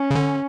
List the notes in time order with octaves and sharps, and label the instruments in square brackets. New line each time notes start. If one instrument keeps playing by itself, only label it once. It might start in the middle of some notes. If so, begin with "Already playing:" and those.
Already playing: [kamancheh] C#4
[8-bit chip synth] C#3
D3